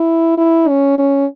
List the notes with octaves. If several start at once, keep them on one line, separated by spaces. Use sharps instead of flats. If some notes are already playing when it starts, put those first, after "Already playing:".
Already playing: E4
E4
C#4
C#4